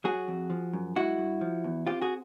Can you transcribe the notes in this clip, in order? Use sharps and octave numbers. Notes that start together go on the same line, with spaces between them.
F#3 F#4 G#4
F2
F3
F#2
G#3 E4 F#4
G2
F3
E2
C4 F4 G4
F#4 G#4